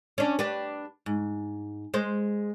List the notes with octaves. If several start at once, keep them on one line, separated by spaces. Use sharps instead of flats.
C#4 D4
D4 G4 B4
G#2
G#3 C5